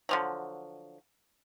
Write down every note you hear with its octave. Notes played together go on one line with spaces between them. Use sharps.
D3 F3 F#3